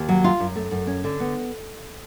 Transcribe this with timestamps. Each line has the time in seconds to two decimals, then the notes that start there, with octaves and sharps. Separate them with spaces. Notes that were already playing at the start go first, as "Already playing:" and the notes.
Already playing: D#2
0.09 F#3
0.24 F4
0.39 F#2
0.56 A3
0.71 F#2
0.87 C#4
1.04 D3
1.20 B3